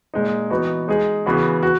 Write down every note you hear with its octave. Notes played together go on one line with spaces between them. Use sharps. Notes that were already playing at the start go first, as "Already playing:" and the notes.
A#2 G#3 D#4
E3 B3 D#4 F#4
G#3 D#4 G#4
C#3 E3 B3 F#4
F#4